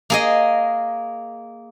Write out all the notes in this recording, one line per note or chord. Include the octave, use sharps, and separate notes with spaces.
A#3 G#4 D#5